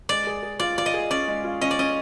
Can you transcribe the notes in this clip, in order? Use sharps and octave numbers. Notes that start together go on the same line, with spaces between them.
G#3 D5
G#4
G#4
F4 D5
F4 D5
D#5
G#4
C#4 D5
G#3
F4
C#4 D#5
D5
C#4 D#5